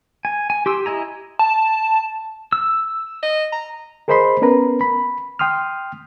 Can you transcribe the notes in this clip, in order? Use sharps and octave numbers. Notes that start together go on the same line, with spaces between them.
G#5
G#5
G4 C6 E6
E4 D#5 G#5 A#5
A5
E6
D#5
A#5
G#4 A#4 C5 D#5 B5 C6
B3 C#4 A#4 B4 A#5
B5
G5 C6 D#6 F6